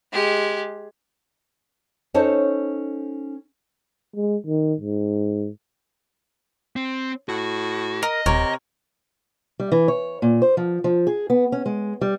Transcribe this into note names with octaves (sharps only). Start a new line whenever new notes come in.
G#3 G4
C#4 D#4 A4 C5 C#5
G#3
D#3
G#2
C4
A2 F#4
A#4 D#5
D#1 C3 A#4 C#5
G3
E3
C#5
A#2
C5
F3
F3
G#4
B3
C#4
G#3
G3